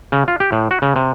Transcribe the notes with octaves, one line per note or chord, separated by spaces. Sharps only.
C#3
F4
G4
A2
F#4
C#3
C3